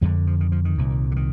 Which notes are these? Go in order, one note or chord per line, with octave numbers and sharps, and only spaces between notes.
F2 D3 G#3
F3
D#3
F3
D#3
C2 A#2
D3
D#3